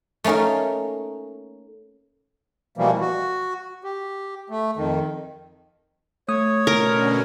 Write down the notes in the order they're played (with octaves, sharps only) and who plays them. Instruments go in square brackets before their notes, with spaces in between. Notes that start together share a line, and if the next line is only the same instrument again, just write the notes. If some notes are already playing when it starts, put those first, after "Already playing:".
[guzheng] A3 A#3 C#4 D#4 A#4
[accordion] B2 E3 F3 G3 A#3
F#4
G4
A3
F2 D#3
[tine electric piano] A3 D#6 [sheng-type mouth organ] C#5
[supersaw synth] B2 D3 C#4 [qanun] A#4